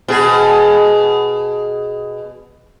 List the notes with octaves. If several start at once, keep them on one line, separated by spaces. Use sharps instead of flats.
B2 G#4